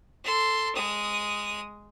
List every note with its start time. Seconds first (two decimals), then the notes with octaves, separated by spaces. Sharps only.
0.24 A4 C6
0.75 G#3 D#6